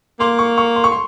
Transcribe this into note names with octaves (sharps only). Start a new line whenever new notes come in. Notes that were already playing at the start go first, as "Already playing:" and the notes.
A#3 C6
C#6
C#6
C6
C#6
C6